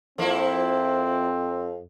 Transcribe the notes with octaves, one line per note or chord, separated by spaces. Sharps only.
F2 F3 A#3 C4 E4